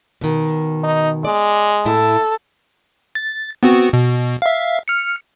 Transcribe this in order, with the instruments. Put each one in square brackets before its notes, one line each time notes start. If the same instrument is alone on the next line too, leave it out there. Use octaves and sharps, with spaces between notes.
[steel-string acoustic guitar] B2 D#3
[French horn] D#4
[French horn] G#3 [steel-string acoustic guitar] D5
[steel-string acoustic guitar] A2 E4 [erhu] A4
[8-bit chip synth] A6
B3 C4 F#4
B2
E5 F5
F6 C#7